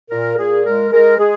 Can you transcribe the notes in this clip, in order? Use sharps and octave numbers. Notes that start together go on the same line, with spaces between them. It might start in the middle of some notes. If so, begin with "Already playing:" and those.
A#2 A#4
A#2 G#4
G#3 A#4
G#3 A#4
G#3 G#4